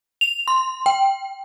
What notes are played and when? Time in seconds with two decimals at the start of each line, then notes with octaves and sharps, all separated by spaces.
0.21 F7
0.48 C6
0.86 G5